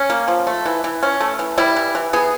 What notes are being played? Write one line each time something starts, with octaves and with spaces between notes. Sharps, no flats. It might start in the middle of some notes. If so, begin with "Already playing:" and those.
Already playing: C#4
A#3
F3
A3
E3
E3
C#4
A3
E3
G3 E4
E3
E3
B3 G#4